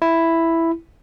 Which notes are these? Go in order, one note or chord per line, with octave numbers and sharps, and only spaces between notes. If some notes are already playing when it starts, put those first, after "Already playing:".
E4